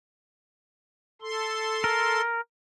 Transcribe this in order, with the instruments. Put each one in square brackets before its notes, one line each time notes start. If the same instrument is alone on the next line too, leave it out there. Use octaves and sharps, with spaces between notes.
[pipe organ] A4 C6
[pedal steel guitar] A#4